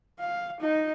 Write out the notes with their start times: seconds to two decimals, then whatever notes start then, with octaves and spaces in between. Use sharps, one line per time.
0.20 F5
0.60 D#4